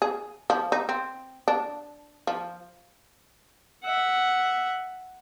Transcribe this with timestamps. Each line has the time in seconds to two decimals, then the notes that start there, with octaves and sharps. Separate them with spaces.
0.02 G#4
0.50 F3
0.72 D#4
0.89 C4
1.48 D4
2.27 F3
3.84 E5 F#5